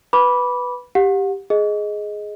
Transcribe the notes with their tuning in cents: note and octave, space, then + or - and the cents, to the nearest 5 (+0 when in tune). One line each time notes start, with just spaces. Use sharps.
B4 +0 B5 -10 D6 -15
G4 +0 F#5 -35
G#4 +10 D#5 +5